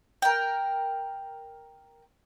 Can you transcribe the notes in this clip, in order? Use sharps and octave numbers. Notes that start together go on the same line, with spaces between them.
A#4 G5